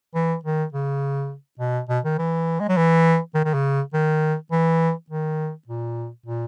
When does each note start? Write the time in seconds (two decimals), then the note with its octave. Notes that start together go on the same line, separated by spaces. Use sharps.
0.14 E3
0.44 D#3
0.73 C#3
1.60 B2
1.89 B2
2.04 D#3
2.18 E3
2.60 G#3
2.69 F#3
2.77 E3
3.35 D#3
3.45 D#3
3.54 C#3
3.94 D#3
4.51 E3
5.10 D#3
5.68 A#2
6.26 A#2